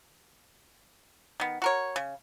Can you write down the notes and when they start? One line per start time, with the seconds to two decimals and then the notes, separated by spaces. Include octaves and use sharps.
1.40 D#3 B3
1.62 F#4 A#4 C#5
1.96 C#3